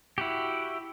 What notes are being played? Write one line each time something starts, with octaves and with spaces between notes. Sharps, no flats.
E4 F#4 G4